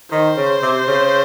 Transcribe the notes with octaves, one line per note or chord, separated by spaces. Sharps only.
D#3 C5
C#3
C3
C#3